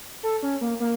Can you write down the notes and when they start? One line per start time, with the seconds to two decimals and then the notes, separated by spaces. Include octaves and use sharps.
0.23 A4
0.43 C#4
0.61 A#3
0.80 A#3